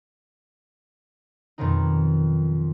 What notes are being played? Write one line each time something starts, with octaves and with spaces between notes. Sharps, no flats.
F2 B2 D#3 F3 F#3 D#4